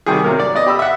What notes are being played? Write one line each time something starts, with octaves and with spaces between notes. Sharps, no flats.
C3 D#3 G3 F#4 G#4
C3 F#3 A#3 A#4
D5
B3 D5 D#5
G4 B5 E6
E5 F#5